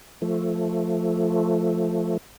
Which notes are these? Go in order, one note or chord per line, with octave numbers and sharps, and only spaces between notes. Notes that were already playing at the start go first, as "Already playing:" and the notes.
F3 A3